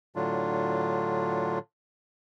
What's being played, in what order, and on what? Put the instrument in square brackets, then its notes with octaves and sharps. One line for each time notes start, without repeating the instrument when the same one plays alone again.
[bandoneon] A2 D3 F#3 D4 F4